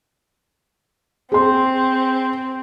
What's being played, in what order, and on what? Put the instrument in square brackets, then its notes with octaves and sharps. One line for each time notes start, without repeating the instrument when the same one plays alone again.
[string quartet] C4 [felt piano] G#4 C6